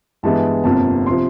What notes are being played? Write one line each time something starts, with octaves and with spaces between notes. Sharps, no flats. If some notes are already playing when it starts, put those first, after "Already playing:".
G2 E3 G#3 B3 A5
G1 F2 C3 F3 A#3 A5
C3 F3 C6